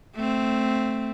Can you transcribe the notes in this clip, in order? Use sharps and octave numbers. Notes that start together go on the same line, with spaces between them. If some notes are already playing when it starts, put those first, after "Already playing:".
A3 C4